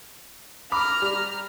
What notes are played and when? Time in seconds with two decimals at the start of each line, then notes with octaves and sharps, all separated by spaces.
0.72 A#5 B5 D6 F6
1.02 G3